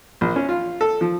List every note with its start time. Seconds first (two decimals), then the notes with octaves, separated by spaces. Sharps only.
0.21 A#1
0.36 C#4
0.49 F4
0.81 A4
1.01 F3